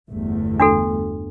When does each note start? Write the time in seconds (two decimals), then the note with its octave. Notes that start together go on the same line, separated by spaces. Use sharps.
0.11 G1 E2 A3
0.60 D4 F#4 A4